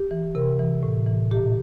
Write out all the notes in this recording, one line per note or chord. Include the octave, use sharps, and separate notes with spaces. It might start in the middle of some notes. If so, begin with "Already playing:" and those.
Already playing: G4
E3
C3 A#4
E3
A2
E3
A#2 G4